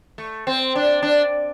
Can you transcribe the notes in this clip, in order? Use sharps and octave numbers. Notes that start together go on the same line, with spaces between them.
A3
C4
D4
D4